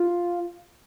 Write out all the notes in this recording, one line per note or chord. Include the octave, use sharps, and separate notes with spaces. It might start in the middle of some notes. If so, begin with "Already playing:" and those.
Already playing: F4